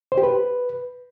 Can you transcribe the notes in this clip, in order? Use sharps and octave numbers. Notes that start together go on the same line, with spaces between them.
C5
G4
B4